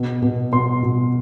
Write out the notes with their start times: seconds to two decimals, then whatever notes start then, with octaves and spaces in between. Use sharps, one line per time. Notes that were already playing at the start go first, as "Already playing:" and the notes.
Already playing: B2
0.22 B2
0.52 B2 C6
0.83 B2